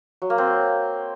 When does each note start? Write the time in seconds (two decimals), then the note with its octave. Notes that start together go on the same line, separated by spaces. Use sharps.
0.22 F#3
0.30 A#3
0.38 C4